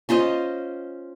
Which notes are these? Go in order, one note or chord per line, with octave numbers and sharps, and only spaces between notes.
C#4 F4 C5 D#5